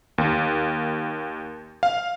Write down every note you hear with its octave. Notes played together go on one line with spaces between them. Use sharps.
D#2
F5